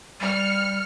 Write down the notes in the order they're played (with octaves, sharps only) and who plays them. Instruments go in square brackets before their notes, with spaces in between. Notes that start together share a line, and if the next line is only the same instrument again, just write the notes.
[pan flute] G3 [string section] F6 C#7